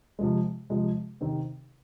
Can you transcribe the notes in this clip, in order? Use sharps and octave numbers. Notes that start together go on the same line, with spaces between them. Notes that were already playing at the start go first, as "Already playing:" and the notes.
C3 F3 G#3
C3 F3 G#3
C3 D#3 C4